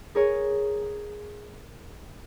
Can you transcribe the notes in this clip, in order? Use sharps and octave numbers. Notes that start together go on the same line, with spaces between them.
G#4 A#4 C#5